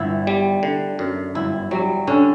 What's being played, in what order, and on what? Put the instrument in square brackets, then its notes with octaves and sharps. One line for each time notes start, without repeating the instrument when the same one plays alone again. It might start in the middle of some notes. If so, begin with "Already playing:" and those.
Already playing: [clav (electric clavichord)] G1 [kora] B3 E4
[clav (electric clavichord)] G3
D3
F#2
[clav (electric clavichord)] G1 [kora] E4
[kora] F#3 [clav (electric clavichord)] G3
[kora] D3 [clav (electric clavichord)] C#4